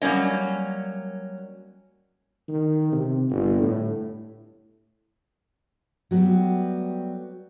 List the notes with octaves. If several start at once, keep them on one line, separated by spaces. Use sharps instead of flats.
F#3 G3 A#3 C#4 D#5
D#3
C3
G1
A2
F#3 G3 A3 B3 F#4 G4